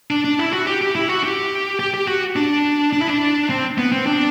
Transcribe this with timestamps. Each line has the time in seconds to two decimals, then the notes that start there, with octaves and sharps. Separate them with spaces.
0.10 D4
0.24 D4
0.39 E4
0.53 F#4
0.67 G4
0.81 G4
0.95 E4
1.09 F#4
1.24 G4
1.79 G4
1.94 G4
2.08 F#4
2.36 D4
2.93 D4
3.00 E4
3.08 D4
3.50 C4
3.78 B3
3.92 C4
4.06 D4